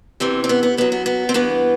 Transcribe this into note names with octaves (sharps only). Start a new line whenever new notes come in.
D2 C3 E3 C4
C4
B3
B3
F#2 F#3 B3
B3
B3
C4
G2 E3 B3